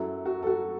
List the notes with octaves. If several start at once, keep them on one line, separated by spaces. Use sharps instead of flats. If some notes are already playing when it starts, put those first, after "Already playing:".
Already playing: F#2 F#3 E4 A4
F#4
A4
F#4